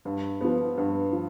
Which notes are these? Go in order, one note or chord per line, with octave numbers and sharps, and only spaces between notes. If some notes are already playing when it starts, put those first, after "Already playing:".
G2
F3 B3
G2
F3